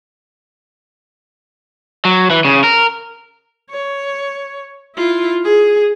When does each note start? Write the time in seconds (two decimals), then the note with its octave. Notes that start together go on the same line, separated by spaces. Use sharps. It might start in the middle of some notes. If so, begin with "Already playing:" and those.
2.05 F#3
2.30 E3
2.45 C#3
2.64 A#4
3.71 C#5
4.96 E4 F4
5.45 G#4